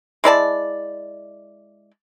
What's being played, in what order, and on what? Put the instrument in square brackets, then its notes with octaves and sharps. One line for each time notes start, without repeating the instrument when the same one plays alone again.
[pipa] G#3 E4 D5 A5